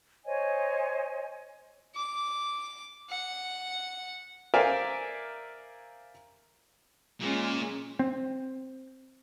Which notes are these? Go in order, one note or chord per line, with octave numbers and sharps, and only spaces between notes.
C5 C#5 D#5 G#5
D6
F#5
A#4 C5 D5 E5 F5 G#5
A#2 G#3 C#4
C4